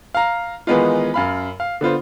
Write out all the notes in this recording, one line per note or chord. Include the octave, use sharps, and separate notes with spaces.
F5 A#5
D#3 E3 G#3 B3 D#4 F4
F#2 F5 B5
F5
D3 B3 F4 C5